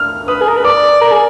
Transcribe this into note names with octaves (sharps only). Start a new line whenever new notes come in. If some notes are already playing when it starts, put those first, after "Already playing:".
Already playing: F6
B4 D#6
G#4
A#4
B4
D5 D6
A#4
G#4